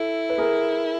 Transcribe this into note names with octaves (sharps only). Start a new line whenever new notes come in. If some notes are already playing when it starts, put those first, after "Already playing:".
Already playing: E4 A4
B4
G#4 A#4